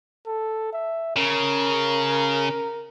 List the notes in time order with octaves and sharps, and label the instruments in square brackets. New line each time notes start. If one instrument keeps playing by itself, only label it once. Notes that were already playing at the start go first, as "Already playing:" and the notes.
[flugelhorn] A4
E5
[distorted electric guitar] C#3 [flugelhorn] A#4